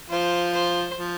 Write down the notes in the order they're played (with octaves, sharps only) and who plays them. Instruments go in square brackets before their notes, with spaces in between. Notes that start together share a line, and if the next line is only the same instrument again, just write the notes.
[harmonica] F3 F4 [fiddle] C5
[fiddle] C5
[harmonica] F3